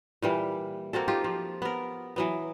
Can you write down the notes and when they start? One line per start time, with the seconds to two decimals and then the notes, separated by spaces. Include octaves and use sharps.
0.22 A#2 E3 G3
0.93 A#3 C4 F#4 A4
1.08 D#4 F4 G4
1.24 F3
1.62 B3 A#4
2.16 E3 F#3 B3